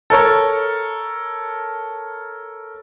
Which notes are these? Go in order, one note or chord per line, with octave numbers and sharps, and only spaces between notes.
A4 A#4 C#5